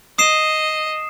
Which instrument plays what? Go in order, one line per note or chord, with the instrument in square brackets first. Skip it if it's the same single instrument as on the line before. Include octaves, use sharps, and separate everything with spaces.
[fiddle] D#5 [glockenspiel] D#6 C7 E7